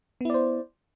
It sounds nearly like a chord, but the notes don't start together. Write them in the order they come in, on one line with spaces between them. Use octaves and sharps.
B3 E4 D5 C5